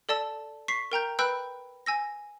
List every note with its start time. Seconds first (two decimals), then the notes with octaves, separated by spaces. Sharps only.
0.09 A4 D5 A5 E6
0.68 C#6 B6 C7
0.92 A#4 G5 A#5 G6
1.19 B4 G5 B5 E6 F#6 G6
1.86 G#5 E6 A#6